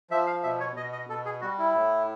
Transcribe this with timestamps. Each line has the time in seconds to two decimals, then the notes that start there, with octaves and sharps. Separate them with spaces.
0.11 F3 E5
0.27 F5
0.43 B2 E5
0.60 C#5
0.76 B2 D#5
0.92 D#5
1.09 B2 A4
1.25 G#4
1.41 G3 F#4
1.59 E4
1.75 A2